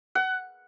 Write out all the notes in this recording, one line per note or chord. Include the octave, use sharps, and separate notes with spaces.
F#5